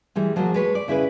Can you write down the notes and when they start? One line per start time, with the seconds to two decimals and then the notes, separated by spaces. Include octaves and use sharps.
0.16 E3 G3 G#3
0.36 F3 F#3 G#3 A#3
0.54 G#3 B4 C#5
0.75 D5
0.88 C#3 E4 G#4 B4